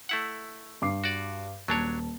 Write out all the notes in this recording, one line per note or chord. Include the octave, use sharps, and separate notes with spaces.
A3 E4 F#5
G2 D6 C7
F#4 D5
D#1 F#3 D4 C#5 A5